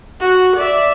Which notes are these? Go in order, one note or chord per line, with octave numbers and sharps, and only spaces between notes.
F#4
D5 E5